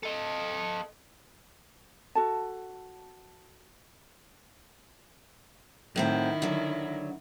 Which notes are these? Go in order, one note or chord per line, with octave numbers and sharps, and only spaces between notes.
A4 D#5
F#4 A4 A5
A2 D#3 F#3 C4 E4
D3 F#3